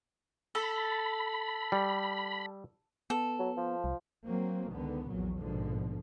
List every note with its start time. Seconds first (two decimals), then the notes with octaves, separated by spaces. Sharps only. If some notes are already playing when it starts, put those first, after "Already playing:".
0.55 A4 B5
1.72 G3
3.10 B3 A4
3.39 F#3
3.57 F3
3.84 C2
4.28 F#3 A#3 C4
4.71 C#2 D3 D#3 B3
5.09 A#1 E2 A#2 F#3
5.40 A#1 G#2 B2 D3 F3